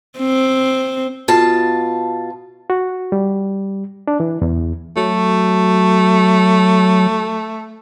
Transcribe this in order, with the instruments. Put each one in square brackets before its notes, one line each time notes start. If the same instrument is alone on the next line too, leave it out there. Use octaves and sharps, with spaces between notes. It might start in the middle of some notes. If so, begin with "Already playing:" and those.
[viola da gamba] C4
[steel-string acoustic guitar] B2 F4 A5
[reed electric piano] F#4
G3
D4
E3
E2
[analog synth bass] F#3 [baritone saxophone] A3